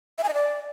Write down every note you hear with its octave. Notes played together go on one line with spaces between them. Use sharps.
E5
G#5
D#5
D5